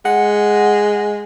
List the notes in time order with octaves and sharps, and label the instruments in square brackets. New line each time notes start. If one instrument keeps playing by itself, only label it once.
[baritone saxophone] G#3 [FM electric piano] F#5